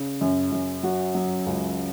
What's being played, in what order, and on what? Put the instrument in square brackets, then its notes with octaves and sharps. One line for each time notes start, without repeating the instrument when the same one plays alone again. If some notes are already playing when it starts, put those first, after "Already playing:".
Already playing: [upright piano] C#3
F#2
F#2
F#3 F#4
F#3
C#2